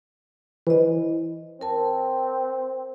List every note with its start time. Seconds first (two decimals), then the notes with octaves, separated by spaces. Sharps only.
0.67 E3 C5 D#5
1.61 C4 A#4 A5